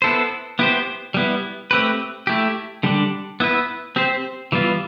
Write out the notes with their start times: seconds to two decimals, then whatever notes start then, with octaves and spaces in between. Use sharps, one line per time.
0.02 B3 E4 A4 C5
0.59 B3 E4 G4 C5
1.14 G3 B3 E4
1.71 A3 C4 G4 B4
2.27 A3 E4 G4
2.83 D3 G3 D4
3.40 B3 E4 B4
3.96 C4 G4 C5
4.52 E3 G3 B3 F4